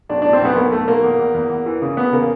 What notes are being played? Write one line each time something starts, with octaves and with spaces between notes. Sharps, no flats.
B1 D4
A2 D4
C4
B1 B3
B1 A#3
B1 A3
B1 A#3
E2
E2
E2
E2
E3
C#3
E2 B3
C#3 A#3